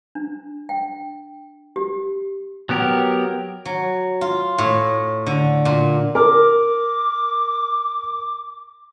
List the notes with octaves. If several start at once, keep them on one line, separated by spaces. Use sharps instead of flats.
D4
G5
G4
F#3 B3 G4 A#4
F#3
F4
A2
D3
A#2
A#4 D6